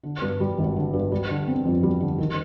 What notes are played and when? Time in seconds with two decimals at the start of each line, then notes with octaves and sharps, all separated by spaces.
0.03 D3
0.22 G2
0.40 G3
0.58 G#1
0.76 D3
0.93 G2
1.12 G3
1.29 D3
1.48 C4
1.65 F2
1.83 G3
2.00 D3
2.18 D#3